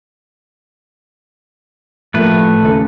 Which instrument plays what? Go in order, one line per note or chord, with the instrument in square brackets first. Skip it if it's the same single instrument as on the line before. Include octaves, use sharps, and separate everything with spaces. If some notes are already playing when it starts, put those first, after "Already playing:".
[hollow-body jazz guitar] A2 F3 A#3 [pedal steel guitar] A3 B4
[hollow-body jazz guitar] D#2 C#3 A4